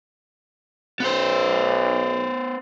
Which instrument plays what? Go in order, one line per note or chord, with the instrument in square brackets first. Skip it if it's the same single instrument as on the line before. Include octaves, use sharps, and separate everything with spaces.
[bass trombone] B1 [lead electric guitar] B3 C5